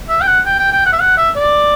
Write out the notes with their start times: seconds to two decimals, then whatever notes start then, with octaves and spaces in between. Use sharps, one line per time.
0.09 E5
0.21 G5
0.27 F#5
0.45 G5
0.59 G5
0.72 G5
0.86 F#5
0.93 E5
1.00 F#5
1.17 E5
1.36 D5